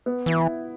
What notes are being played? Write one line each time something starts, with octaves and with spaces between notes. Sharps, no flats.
B3
E3 E4